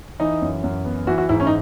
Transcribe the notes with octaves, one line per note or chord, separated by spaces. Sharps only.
E3 D#4
F#2
F#2
B3
E3 F#4
F#4
G#2 E4
C#4
D#4